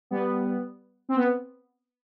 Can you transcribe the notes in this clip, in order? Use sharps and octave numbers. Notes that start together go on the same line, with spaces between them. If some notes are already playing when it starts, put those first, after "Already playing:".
G3 B3
C4
B3